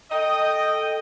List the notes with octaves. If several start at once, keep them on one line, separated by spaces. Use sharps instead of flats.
A4 D#5 G5